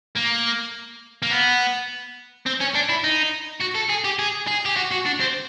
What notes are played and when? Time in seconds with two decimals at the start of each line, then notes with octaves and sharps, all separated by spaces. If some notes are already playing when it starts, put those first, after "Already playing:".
0.15 A#3
1.22 A#3
1.31 B3
2.46 C4
2.60 C#4
2.75 D4
2.89 E4
3.04 D#4
3.61 F#4
3.76 A4
3.90 G#4
4.05 G4
4.19 G#4
4.47 G#4
4.65 G4
4.77 F#4
4.91 F#4
5.06 D4
5.20 C4